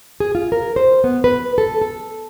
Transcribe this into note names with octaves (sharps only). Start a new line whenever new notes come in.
G#4
F4
A#4
C5
B3
B4
A4
A4